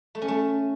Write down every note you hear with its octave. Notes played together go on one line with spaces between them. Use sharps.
A3
C#4
A3